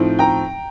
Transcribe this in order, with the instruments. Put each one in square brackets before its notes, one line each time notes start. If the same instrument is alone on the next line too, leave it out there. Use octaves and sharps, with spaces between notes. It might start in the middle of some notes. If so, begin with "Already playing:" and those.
Already playing: [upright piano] A2 F3 C4 D#4
G5 A#5